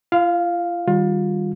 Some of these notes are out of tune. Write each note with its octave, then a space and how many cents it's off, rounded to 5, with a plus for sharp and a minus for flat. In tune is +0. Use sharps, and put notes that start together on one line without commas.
F4 -40 F5 +0
D#3 +0 G3 +0 F4 +25